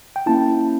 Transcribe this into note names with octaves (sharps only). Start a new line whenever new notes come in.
G5
A#3 C#4 E4 A5